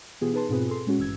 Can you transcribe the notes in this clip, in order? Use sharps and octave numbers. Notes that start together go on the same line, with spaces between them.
B2 E3 B3 F4 G4 G#4
D#4 G#4 B4 A5 C6
G#2 B2 C4 F4 G#4 B4
G#4 A4 C6
A#2 G#3 C#4 F#4
G#1 G2 E3 E6 G#6